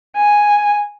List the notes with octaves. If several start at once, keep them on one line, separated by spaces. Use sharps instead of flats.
G#5